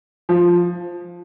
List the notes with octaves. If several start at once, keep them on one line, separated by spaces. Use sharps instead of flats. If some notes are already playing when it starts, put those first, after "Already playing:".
F3